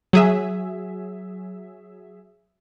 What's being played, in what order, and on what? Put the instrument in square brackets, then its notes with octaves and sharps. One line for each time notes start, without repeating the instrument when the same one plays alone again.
[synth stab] F#3 G#4 E5